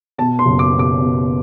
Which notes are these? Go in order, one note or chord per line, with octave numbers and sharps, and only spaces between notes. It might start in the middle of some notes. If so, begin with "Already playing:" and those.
B2 A5
C6
F#1
D6
B2
D6
B2